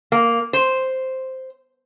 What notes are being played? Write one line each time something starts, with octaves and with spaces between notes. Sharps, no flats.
A#3
C5